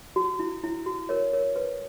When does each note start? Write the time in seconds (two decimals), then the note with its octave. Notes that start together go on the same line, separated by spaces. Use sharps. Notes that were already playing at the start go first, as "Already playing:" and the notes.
0.16 F#4
0.39 E4
0.63 E4
0.86 F#4
1.09 A#4 C#5
1.33 A#4 C#5
1.56 B4